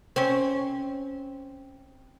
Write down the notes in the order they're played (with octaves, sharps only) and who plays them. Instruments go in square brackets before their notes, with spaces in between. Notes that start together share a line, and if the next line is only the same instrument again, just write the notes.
[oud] C4 C#4